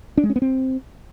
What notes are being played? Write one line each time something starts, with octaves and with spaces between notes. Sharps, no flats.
D4
G#3
C#4
B3
C4